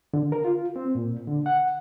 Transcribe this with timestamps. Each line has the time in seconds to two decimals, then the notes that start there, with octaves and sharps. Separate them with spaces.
0.14 D3
0.32 A#4
0.45 F4
0.76 C4
0.95 A#2
1.27 D3
1.46 F#5